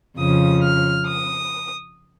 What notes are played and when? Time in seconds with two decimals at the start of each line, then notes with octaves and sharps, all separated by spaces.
0.17 F2 C#3 F3 D#6
0.63 F6
1.07 D#6